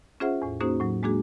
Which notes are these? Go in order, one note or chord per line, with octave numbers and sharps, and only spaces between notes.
C#4 F4 G#4 C5 E5 F#5
E2 A2
A#3 C#4 D#4 F#4 G#4 C5
A2 F#3
G#3 A#3 D4 F#4 G#4